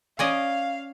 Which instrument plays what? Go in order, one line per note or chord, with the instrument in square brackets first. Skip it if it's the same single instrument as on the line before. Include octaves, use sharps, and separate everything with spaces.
[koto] C#4 D5 D#5 [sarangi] F5